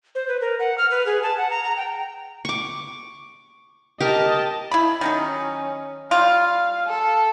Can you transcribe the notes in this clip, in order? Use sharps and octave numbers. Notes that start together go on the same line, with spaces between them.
C5
B4
A#4
F#5
F6
B4
G#4
A5
F#5
A#5
A#5
G5
C#6 D6
G4 A#4 D#5 A5
E4 B5
D#3 F#3 C#4 D#4
G3 F4 F5
A4